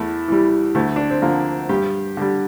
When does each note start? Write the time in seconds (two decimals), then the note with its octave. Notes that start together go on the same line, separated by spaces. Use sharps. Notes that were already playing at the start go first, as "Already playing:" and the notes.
Already playing: E2 A3
0.28 E3 G3
0.75 D2 A3
0.96 D4
1.10 C4
1.22 D3 F3 A#3
1.69 G2 G4
2.17 D3 G3